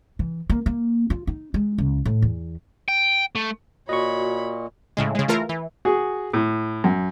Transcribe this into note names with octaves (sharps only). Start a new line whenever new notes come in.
E3
A#3
A#3
F4
D#4
G#3
C#2
A2
E2
G5
A3
A#2 F#4 C#5 D#5 B5 C#6
A2 C#3 G#3
C#3 G#3
E3 A3 F4 A#4
E3
F#4 G#4
A2
F#2